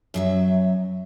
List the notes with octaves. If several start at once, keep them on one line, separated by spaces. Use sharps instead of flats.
F#2 F#3 E5